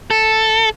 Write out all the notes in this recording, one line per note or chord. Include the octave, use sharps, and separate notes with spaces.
A4